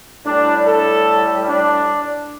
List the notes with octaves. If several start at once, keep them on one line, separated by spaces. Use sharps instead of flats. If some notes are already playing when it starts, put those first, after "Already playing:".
A2 G3 D4
A4
D4